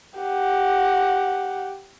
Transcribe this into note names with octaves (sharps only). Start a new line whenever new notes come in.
G4 F#5